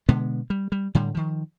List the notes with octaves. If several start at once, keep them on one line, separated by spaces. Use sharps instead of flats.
B2 D3 G#3 B3
G3
G3
A2 D3 G3
D#3 F3